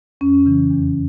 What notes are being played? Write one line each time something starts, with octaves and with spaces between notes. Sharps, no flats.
F2 C#4
C#3 E3
E2